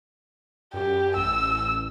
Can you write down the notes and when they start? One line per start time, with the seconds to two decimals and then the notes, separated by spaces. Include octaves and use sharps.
0.73 F#2 G4
1.17 A1 E6